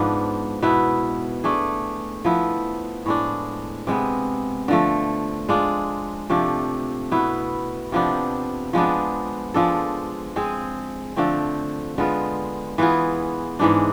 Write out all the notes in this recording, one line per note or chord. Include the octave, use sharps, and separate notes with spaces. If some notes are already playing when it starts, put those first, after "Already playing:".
Already playing: G#2 F3 B3 D4
B2 B3 E4
A3 D4 G#4
F3 B3 E4
A2 G#3 D4
C3 G#3 B3
D3 F3 A3
G#3 D4 F4
C3 F3 A3 D4
B2 B3 E4
C3 F3 B3 D4
F3 G#3 B3 D4
F3 G#3 D4 A4
G#3 C4 G#4
D3 F3 A3 C4
D3 G#3 B3 F4
E3 B3 F4 G#4
G#2 E3 G#3 D4